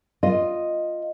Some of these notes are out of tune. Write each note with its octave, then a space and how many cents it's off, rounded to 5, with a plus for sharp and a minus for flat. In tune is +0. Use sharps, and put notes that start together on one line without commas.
F4 +0 D#5 +0